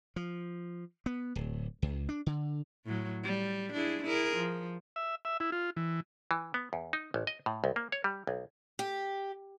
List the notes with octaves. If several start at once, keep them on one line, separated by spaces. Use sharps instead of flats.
F3
B3
D1
C#2
D4
D3
A2 F#3
G3
D4 E4 G#4
E4 G#4 A#4
F3
E5
E5
E4
F4
E3
E3
B3
E2
D#4
A1
D#5
A2
C2
A#3
C#5
G3
B1
G4